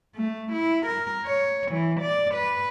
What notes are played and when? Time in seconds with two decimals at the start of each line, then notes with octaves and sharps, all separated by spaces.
0.15 A3
0.52 E4
0.87 A#4
1.25 C#5
1.71 E3
2.00 D5
2.35 B4